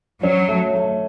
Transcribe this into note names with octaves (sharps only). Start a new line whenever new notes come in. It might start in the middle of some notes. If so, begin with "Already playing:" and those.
F#3 C#4
A3
A3